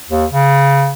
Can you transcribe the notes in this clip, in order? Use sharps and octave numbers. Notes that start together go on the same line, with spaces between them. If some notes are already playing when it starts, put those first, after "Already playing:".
D#2
C#3